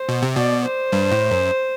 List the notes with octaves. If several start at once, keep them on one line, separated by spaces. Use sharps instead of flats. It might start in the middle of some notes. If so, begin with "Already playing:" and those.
Already playing: C5
B2
C3
B2 D5
C5
G2
A2
F#2